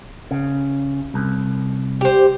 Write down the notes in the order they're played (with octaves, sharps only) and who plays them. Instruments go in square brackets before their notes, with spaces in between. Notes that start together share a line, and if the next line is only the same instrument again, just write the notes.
[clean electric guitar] C#3
C2
[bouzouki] G4 C5